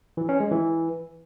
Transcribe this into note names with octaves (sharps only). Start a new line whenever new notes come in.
E3
C#4
G#3
E3